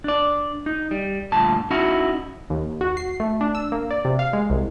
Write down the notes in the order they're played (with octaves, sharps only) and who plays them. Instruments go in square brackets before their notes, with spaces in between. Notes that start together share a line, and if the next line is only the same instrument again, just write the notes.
[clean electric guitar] D4 D5
D#4
G3
D2 G2 A#2 A5
C#4 D#4 E4 F#4
[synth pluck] D#2
F#4
C7
A3
D4
E6
A#3
D5
C3
F5
G#3
C2